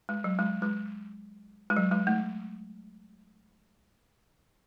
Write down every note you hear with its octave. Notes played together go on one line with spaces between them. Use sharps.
G#3
F#3
G#3
G#3
G#3
F#3
G#3
A3